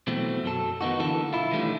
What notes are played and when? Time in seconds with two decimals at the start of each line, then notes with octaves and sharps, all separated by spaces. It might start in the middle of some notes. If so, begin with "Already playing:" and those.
0.07 B2 E3 F#3 A3 C4
0.44 F#2 F#3 A4
0.81 D#3 B3 D#4 F#4
1.00 D3 E3 A#3 A4
1.33 B1 E4 F4
1.51 D#3 E3 G3 A3 C#4